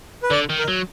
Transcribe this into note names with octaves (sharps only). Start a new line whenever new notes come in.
B4
D3 D5
D#3
A#4
F#3